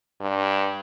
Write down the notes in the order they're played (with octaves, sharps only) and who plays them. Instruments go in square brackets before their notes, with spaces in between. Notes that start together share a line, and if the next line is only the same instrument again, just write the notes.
[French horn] G2